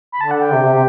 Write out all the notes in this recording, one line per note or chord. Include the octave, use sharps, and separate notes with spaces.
B5
D3 A5
F#5
G5
C3
C3
C3